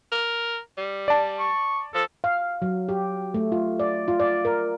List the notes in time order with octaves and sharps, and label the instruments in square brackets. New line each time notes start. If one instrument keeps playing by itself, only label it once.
[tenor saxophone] A#4
G3
[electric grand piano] D5 A5
[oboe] C#6
[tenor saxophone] F3 [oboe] A4
[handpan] F5
F#3
G4
A3
F4
D5
F4
D5
A#4